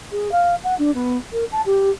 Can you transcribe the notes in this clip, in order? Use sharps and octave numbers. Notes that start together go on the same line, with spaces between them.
G#4
F5
F#5
D4
B3
A#4
A5
G4